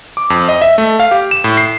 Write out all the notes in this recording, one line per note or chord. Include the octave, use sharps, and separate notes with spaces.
D6
F2
D#5
E5
A3
F5
G4
E7
A2
C7